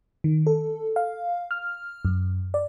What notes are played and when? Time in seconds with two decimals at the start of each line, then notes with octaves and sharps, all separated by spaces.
0.24 D#3
0.47 A4
0.96 F5
1.51 F6
2.05 F#2
2.54 D5